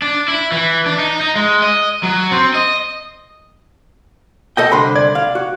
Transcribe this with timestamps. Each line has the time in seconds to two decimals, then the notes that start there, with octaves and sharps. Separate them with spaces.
0.02 D4
0.28 E4
0.52 E3
0.86 D4
0.99 D#4
1.21 D#4
1.36 G#3
1.62 D#5
2.03 F#3
2.31 C4
2.54 D#5
4.57 A4 D#5 G5
4.72 C2 D3 B5 C6
4.95 D5 G#6
5.15 F5
5.35 F#4